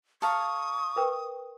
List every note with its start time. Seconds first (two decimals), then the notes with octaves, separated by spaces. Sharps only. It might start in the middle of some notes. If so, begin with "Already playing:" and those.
0.22 A4 F5 A#5 C#6 D#6
0.96 A#4 B4 G5